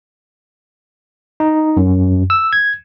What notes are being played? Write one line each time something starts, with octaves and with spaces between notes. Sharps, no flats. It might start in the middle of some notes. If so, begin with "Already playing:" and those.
D#4
F#2
E6
G#6